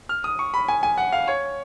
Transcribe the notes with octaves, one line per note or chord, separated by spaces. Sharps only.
F6
D#6
C#6
B5
G#5
G#5
F#5
F5
C#5